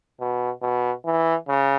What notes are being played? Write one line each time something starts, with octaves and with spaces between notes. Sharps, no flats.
B2
B2
E3
C#3